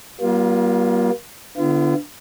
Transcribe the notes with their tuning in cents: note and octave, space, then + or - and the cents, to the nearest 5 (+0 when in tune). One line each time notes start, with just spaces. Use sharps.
G3 -35 A#3 +40 F4 +0
D3 +0 B3 +25 F4 -40